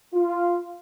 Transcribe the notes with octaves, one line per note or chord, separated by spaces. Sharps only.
F4